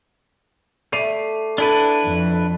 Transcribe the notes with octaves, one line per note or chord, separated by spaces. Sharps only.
A3 D5 C7 D#7 F7
D4 E4 A4 B4 A5
F2